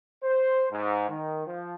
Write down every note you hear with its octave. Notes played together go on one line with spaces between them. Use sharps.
C5
G#2
D#3
F3